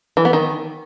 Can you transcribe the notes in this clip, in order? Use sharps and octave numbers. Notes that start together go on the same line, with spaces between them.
E3
B3
D#3